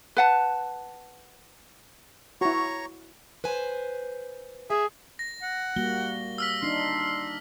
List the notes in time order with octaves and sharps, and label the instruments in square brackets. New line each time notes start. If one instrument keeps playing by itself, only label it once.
[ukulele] B4 F#5 A5
[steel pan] E4 F#4 [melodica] C#5 A#5 C#6
[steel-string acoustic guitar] B4 C5 G#5
[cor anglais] G#4 [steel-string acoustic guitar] E5
[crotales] A#6
[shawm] F#5
[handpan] G3 A#3 F#4 [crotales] G7
[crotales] E6 F6 B6
[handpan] D4 D#4 [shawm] C6